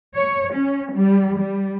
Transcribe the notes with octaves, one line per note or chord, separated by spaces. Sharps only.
C#5
C#4
G3
G3